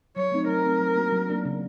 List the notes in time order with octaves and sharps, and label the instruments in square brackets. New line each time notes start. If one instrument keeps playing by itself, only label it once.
[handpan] F#3 [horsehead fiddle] C#5
[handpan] A3 C4 D#4
[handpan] F#3 [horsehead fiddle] A#4
[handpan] A3 C4 D#4
F#3
A#3 D4 F#4
F#3
A#3 D4 F#4
C#3